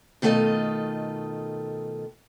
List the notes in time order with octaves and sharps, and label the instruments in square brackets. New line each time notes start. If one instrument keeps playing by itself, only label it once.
[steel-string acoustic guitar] B2 D#3 A3 F4 A4 D#5